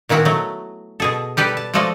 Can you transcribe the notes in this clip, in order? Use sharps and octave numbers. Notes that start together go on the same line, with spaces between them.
A#2 D#3 B3 E4 F#4 F#5
F#3 A3
B2 G#4 A4
G3 G4 A4 B4
A5
F3 G#3 A3 A4 D5 D#5